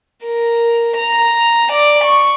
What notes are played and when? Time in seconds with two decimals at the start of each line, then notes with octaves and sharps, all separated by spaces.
0.25 A#4
0.98 A#5
1.72 D5
2.04 C#6